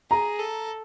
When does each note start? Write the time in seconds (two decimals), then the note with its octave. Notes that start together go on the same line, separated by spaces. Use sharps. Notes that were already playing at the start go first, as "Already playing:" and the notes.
0.11 G#4 A#5
0.39 A4